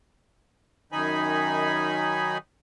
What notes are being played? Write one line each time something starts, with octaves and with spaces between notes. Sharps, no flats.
F#2 D#3 D#4 G#5 B5